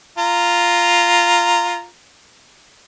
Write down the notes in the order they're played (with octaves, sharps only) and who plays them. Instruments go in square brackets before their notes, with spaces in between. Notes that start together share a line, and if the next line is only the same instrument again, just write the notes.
[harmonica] F4 A#5